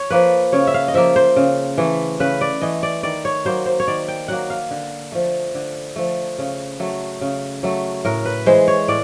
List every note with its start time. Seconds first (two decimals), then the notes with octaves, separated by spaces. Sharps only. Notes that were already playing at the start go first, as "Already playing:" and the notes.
Already playing: C#5
0.10 F3 A#3 B4
0.53 C#3 C#5
0.67 E5
0.74 F5
0.88 D#5
0.94 F3 A#3 E5
1.16 C5
1.36 C#3
1.78 E3 A3
2.20 C#3 B4
2.41 D5
2.62 E3 A3 D#5
2.83 D5
3.03 D#3 D5
3.25 C#5
3.45 F#3 A#3 C5
3.66 C5
3.80 C#5
3.88 D#3 D5
4.08 G5
4.28 F#3 A#3 F#5
4.50 F5
4.71 D3
5.12 F3 A3
5.55 D3
5.96 F3 A3
6.38 C#3
6.79 F#3 A3
7.21 C#3
7.63 F#3 A3
8.05 A2 A#4
8.25 B4
8.46 E3 G#3 C5
8.68 C#5
8.88 A2 D5